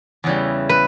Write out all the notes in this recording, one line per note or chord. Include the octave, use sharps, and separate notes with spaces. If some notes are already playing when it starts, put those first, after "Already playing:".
E2 C#3 E3 G3
B4